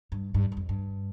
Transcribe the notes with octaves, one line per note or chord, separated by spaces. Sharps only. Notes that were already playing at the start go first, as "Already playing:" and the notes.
G2
G2
G2
F2
G2